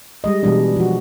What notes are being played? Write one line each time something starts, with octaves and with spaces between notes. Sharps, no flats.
G3 G#3 D#5
B2 E3 G3 G#3 D4
F3 F#4